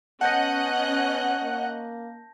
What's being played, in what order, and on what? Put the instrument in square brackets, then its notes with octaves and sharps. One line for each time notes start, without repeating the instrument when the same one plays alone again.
[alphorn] B3 [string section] C#4 D#5 F#6 [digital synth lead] F#5 [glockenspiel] A5 G6 A#6
[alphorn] A#3